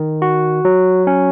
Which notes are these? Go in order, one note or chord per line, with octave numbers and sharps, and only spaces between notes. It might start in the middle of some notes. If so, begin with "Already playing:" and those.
Already playing: D#3
F#4
F#3
C#4